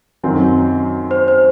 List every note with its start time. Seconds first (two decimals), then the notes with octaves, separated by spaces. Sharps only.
0.23 F#2 D#3 F#3 C4
1.11 C5
1.28 C5